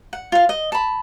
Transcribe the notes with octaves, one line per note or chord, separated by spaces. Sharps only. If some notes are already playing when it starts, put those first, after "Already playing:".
F#5
F4 F5
D#5
A5 B5